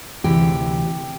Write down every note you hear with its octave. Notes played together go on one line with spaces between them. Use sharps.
D2 C3 E3 G4